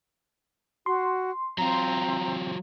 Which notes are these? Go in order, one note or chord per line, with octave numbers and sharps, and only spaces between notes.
F#4 C6
F#3 C4 F4 A#5